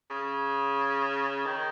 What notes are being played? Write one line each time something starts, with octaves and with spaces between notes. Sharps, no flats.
C#3
D#3